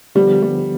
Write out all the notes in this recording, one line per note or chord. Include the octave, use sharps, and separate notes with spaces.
D3 F3 G3 B3
G3